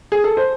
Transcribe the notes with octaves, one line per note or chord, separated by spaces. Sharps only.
G#4
A4
C5